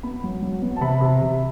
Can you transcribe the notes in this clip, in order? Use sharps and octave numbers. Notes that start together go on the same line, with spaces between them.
B3 B5
F#3
F#3
B3
A5
C3 B5
C3
C3